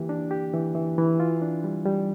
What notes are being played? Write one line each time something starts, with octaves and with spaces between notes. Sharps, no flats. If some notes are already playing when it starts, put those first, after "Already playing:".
Already playing: E3 A#3 G4
D4
G4
E3
E3
E3
F4
D4
G3
G3